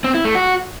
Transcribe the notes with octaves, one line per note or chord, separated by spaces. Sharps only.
C4
E4
A3
F#4